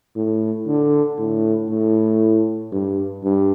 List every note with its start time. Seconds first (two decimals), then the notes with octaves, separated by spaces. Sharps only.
0.16 A2
0.67 D3
1.18 A2
1.70 A2
2.72 G2
3.24 G2